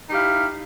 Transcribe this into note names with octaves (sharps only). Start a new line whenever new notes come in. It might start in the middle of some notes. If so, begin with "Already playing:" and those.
D#4 E4 G4 F5